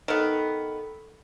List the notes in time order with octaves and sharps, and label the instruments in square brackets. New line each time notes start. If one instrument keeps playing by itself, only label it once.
[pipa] D#3 B3 [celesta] A4 E6 D7